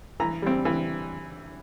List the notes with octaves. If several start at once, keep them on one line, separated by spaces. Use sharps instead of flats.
E3 A#5
G3 C4
E3